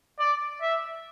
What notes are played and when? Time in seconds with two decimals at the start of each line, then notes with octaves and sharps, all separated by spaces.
0.19 D5
0.62 E5